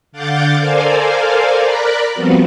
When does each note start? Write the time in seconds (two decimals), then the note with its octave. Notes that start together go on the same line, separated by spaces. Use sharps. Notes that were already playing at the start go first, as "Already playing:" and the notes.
0.12 D3 F5 F#5 D6 G6 A6
0.58 A4 A#4 C5 D5 F5 G#5
1.62 A#4 D5 A#5 B5 F#6
2.14 F3 G3 B3 C4 F4 F#4